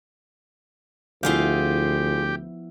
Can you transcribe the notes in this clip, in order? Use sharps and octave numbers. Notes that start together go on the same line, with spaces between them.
D2 F3 B3 E4 F4 G4 G#4 F5